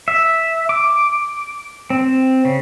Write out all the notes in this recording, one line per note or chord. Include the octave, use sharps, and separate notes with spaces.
E5
D6
C4
C#3